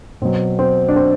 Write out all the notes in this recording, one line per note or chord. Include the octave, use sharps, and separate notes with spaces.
B2 F#3 C4
C4
D4
C4